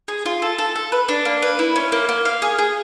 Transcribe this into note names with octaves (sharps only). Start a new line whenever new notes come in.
G#4
F4
A4
A4
A4
B4
D4
A#3
B4
E4
C#4
A#3
A#3
F5
G#4
G#4